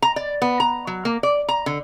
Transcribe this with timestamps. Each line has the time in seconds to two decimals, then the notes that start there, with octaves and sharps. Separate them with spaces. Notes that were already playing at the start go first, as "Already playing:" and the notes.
0.02 A#5
0.16 D5
0.42 B3
0.60 A#5
0.87 F#3
1.05 A#3
1.23 D5
1.49 A#5
1.66 D3